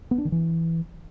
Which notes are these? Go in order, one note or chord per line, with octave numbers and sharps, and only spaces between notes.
B3
D4
D#3
E3